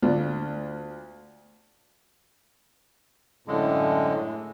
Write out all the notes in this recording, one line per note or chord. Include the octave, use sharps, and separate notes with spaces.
D2 F4 D5
F#2 A2 D3 G#3